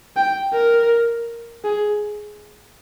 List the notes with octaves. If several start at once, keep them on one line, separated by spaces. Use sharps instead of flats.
G5
A#4
G#4